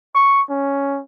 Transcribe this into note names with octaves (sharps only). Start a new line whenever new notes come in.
C#6
C#4